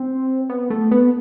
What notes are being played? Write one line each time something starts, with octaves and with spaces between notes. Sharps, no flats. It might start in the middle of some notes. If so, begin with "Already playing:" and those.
Already playing: C4
B3
A3
B3